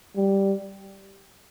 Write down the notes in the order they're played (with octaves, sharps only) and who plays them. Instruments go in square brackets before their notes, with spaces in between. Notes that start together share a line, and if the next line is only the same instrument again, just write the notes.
[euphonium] G3